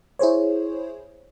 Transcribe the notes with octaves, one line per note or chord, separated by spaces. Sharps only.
E4 G#4 C5 C#5